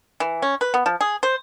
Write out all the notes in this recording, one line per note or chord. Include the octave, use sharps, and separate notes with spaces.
E3
C#4
B4
B3
F3
G#4
C5